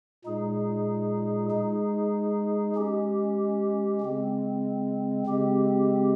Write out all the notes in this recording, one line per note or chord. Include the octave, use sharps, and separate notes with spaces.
A#2 G#3 D#4 G#4
G#3 D#4 G#4
G#3 C#4 G4
C#3 G#3 C4
C#3 G#3 C4 G4